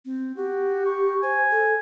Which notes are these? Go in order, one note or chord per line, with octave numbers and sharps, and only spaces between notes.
C4
F#4 G4
C#6
C5 G#5
A4